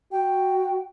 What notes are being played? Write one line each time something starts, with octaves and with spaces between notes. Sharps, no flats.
F#4 G5